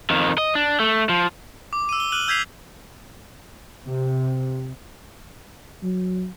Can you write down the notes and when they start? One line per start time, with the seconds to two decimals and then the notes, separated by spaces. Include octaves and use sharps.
0.10 F2 D#3
0.38 D#5
0.55 D4
0.80 A3
1.09 F3
1.73 D6
1.89 E6 D#7
2.00 G7
2.12 F6 F#6 D#7 F#7
2.28 E6 G6 G#6 B6 C7 F7
3.85 C3
5.83 F#3